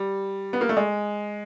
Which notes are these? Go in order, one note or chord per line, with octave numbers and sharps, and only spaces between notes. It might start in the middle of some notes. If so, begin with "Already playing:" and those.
Already playing: G3
B3
A#3
A3
G#3